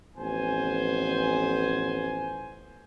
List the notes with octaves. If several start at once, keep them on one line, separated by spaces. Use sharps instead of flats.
A1 F2 B3 C5 G#5